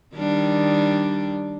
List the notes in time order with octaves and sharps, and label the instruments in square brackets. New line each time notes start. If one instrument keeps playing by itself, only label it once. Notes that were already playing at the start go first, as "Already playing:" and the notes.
[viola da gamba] D#3 G3 D4